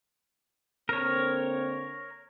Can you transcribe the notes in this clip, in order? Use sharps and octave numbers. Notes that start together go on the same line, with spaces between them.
D3 A#3 C4 A#4 C#5